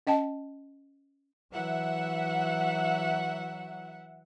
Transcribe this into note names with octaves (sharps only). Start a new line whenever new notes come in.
C#4 D#5 G5 A5
E3 F#3 E5 F#5